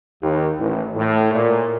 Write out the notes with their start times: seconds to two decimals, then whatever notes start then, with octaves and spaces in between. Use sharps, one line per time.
0.22 D#2
0.59 A1
0.95 A2
1.33 A#2